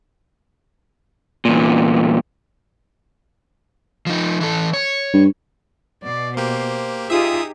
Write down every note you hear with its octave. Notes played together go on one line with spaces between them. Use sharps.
E2 A#2
F3 D#4
E3 A4
C#5
G2
B2 D5
A#3 G4 C5
D#4 F4 G4 G#4 E5 D#6